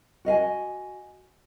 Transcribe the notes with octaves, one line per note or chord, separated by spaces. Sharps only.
F#4 D#5 F5 G#5